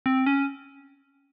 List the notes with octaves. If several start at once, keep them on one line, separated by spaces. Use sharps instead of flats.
C4
C#4